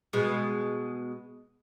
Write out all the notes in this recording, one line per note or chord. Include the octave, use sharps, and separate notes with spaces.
B2 G#3